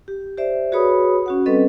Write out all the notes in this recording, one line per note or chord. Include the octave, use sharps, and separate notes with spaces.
G4
G4 C5 D5 E5
F#4 G#4 B4 C#5 B5 D#6
C#4 F#4 F#5
G3 C4 C#4 A4 B4 D#5